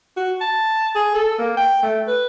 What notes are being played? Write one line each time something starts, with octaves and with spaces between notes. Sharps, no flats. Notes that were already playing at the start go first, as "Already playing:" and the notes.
F#4
A5
G#4
A4
A#3
G5
A3
B4